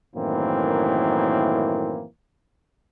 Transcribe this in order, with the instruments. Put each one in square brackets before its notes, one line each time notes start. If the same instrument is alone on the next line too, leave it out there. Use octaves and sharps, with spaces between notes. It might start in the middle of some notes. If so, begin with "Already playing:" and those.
[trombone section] F#2 A2 D#3 E3 A#3 C4